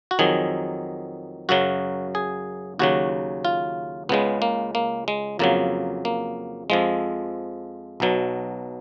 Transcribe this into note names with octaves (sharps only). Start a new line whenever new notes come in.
F#4
F2 D#3 F#3 G#4
F#2 C#3 F#3 F#4
G#4
D#2 C#3 F#3 F#4
F4
C#2 C#3 G#3 B3
A#3
A#3
G#3
F2 C#3 F#3 A#3
A#3
F2 F3 G#3
B1 B2 F#3